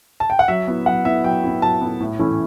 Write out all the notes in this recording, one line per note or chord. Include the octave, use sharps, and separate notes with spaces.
A5
G5
F#5
F#3 E5
B3 E4
F#3 F#5
B3 E4 E5
F#3 G5
B3 E4
F#3 A5
B3 E4
A2
E3 A3 C#4 E4